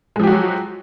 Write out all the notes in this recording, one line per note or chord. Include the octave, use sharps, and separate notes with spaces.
F3 F#3 G#3 F#4 G4